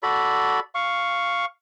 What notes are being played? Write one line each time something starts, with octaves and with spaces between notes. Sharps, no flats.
F#4 A4 D5 B5
F5 C#6